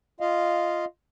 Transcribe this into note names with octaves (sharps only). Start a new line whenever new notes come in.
F4 D#5 F5